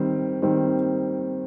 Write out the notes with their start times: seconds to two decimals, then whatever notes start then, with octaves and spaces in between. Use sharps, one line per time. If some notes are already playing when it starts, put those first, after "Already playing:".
Already playing: D#3 G3 C4
0.42 D#3 G3 C4